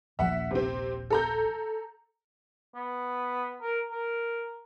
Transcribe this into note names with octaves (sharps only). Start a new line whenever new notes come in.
D#1 A#1 F3 E5 F#5
C3 C4
A4 A#5 G6
B3
A#4
A#4